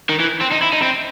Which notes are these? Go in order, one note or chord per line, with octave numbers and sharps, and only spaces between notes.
D#3
E3
C4
D#4
E4
D#4
C4